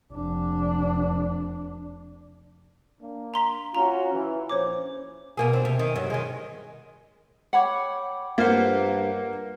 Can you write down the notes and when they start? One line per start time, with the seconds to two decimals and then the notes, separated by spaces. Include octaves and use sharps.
0.12 F1 D4
3.01 A#3 D4
3.34 A#5 C6 B6
3.75 C#4 F4 F#4 A#5
4.13 E3
4.49 A#1 C#4 C5 C#5 D6
5.37 B2 A#3 G#4
5.53 C4 D4
5.65 C3
5.79 D#3
5.96 G2 F#3
6.10 D#3 G#3
7.53 C#5 F#5 G5 B5 D6
8.38 G2 A#3 F4 C5 F#5 F6 B6